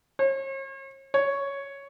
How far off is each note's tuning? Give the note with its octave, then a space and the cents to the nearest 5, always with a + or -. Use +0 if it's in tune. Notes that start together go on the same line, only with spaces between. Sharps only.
C#5 -40
C#5 +5